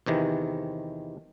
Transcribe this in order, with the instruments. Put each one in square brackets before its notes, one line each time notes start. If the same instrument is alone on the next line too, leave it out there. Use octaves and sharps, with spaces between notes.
[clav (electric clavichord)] E2 C3 D#3 E3